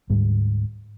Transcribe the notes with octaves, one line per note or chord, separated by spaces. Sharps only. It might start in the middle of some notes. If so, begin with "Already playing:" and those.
D2 G#2 G3